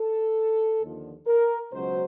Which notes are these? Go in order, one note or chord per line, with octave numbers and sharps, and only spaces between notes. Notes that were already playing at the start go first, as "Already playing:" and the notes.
Already playing: A4
D#2 D3 F3
A#4
C#2 B2 F#3 C5